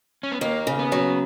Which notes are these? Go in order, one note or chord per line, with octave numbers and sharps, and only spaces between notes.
C#4
B3
D#2 A#3
C#3
B3
F#3